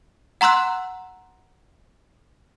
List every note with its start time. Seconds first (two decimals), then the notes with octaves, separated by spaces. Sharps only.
0.41 F#5 A#5 C6 E6 F#6